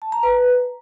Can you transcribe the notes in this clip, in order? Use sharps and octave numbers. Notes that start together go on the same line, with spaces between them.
A5
A#5
B4